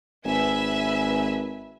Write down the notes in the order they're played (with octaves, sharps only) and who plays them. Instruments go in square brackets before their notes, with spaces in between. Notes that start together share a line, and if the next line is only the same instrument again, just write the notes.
[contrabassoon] G#1 [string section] B4 E5 G#5